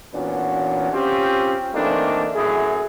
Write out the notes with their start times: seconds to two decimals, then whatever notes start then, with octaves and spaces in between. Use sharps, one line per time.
0.14 A#2 E3 B3 C#4 D4 F#4
0.92 C4 C#4 F4 G4
1.75 E3 A3 A#3 C4 D4 D#4
2.35 F#2 A2 E4 G#4